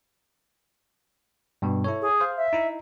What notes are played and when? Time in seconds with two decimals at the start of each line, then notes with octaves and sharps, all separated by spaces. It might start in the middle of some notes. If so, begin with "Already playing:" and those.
1.62 G2 B2
1.84 E4 A4 C#5
2.01 G#4
2.21 C5 F5
2.37 E5
2.53 D#4 E4